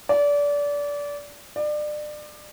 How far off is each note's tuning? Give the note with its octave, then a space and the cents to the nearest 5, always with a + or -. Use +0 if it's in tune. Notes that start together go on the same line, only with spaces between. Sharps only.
D5 -25
D5 +30